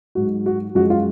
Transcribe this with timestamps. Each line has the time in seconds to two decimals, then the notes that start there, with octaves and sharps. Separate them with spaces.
0.15 G#2 F#3 F#4
0.46 F#4
0.75 F#2 F3 G#3 F#4
0.90 F4